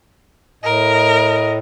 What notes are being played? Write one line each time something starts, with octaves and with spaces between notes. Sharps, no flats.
A2 A#4 D#5
D#5